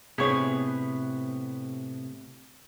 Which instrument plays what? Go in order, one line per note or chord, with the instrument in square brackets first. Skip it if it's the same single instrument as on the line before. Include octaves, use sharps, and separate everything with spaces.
[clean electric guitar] A2 C3 B3 [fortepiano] G#4 C#5